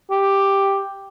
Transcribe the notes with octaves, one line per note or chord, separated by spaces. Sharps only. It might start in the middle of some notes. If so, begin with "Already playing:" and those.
G4